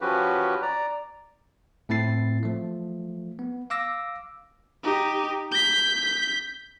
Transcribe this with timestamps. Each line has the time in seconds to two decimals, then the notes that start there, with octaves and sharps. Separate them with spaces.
0.01 F3 C#4 F#4 G4 B4
0.62 D5 A#5
1.89 A2 A3 C4 E4 A6 C7
2.43 F3 A3
3.39 B3
3.70 F5 D6 E6 A#6
4.84 D#4 G4
5.52 G6 B6